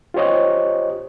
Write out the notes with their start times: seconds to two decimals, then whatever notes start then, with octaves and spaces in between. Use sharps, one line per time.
0.14 F4 G4 C5 C#5 D#5